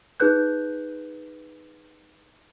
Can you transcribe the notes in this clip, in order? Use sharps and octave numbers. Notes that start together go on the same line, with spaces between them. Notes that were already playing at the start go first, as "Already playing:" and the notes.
D#4 G#4 B4 F#6 G6